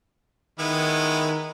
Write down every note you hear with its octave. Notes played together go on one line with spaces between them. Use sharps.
D#3 G#3 B3 E4